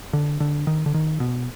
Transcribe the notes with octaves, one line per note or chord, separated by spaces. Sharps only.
D3
D3
D#3
D3
D#3
B2